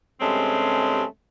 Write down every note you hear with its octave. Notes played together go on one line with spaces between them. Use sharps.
G2 C3 G#3 A3 C4 C#4